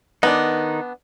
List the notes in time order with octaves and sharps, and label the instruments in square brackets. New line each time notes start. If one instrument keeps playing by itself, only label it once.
[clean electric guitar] D#3 D#4 [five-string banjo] B3 D4